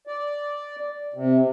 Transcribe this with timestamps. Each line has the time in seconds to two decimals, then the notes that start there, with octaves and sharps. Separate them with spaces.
0.07 D5
1.14 C3